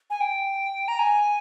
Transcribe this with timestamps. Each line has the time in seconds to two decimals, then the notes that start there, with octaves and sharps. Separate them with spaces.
0.10 G#5
0.20 G5
0.88 A#5
0.99 G#5